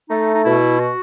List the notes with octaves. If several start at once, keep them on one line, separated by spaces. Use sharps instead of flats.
A3 D#4
D#4
B2 E4
F#4